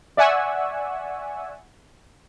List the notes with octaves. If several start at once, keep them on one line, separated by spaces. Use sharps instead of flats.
D5 E5 F#5 G#5 C#6 E6